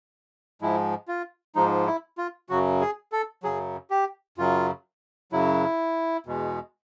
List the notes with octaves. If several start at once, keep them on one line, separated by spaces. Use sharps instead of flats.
G#2 F3 G#3 E4
F4
G#2 F3 G#3 D#4
E4
F4
F#2 C#3 F#3 F#4
G#4
A4
F#2 C#3 F#3 G#4
G4
F#2 C#3 F#3 F4
F#2 C#3 F#3 E4
E2 B2 G#3